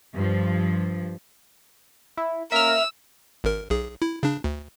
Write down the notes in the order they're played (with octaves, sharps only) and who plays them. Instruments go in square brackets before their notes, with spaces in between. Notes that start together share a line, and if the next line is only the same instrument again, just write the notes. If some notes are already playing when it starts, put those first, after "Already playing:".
[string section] G2 F3
[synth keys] E4
[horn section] A#3 C#4 A#4 [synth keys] E5 F6 [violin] E6
[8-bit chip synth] G#1 A#4
B1 G#4
E4
C#3 D4
D2